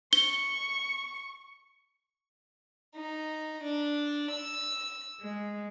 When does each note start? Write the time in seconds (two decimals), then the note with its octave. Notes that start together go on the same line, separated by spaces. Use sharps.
0.13 C#6 G7
2.95 D#4
3.63 D4
4.32 E6
5.20 G#3